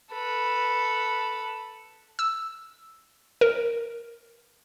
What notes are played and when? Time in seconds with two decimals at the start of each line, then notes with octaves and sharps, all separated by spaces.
0.12 A4 B4
2.19 E6
3.41 A#4